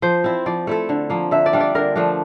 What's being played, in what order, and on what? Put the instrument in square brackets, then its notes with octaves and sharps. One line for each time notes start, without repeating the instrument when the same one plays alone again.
[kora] F3 [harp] C5
[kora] C4 E4
[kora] F3 [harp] D5
[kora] A3 E4 A4
D3
F3 A#3
[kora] D3 [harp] E5
[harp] D5
[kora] G3 D4 F4
[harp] D5
[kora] D3 [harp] A#4
[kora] F3 A3 D4